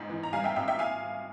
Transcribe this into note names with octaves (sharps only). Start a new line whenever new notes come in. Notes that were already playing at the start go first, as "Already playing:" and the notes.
Already playing: G1 G#2
E3
A#5
G3 F5 G#5
E5 G5
G#1 E5 G5
E5 G5
F5 G#5